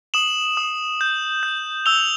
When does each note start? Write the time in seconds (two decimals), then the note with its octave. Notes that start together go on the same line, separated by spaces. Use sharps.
0.14 D#6 E7 F#7
0.57 D#6
1.01 G6
1.43 G6
1.86 E6 F7 G7